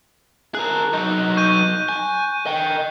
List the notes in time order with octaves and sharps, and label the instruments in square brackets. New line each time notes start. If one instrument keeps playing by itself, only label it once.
[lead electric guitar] G#4 A#4 [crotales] F#6
[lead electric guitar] F#3 D#4
[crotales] C#6 G6 D#7
[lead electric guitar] G#5
D#5 G5